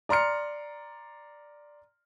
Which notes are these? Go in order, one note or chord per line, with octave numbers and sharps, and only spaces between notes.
D5 A#5 C6 F6 C#7